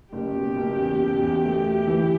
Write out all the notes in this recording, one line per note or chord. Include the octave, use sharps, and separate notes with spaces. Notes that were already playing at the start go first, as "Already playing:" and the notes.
F#1 G4
B2
F#1
E2
B2
E2
A3
B2
E3